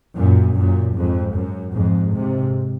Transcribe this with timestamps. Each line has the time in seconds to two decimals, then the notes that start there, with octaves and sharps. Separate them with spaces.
0.16 F#2 A#2
0.55 F#2 A#2
0.95 F2 G#2
1.35 F#2
1.74 F2 G#2
2.14 G#2 C3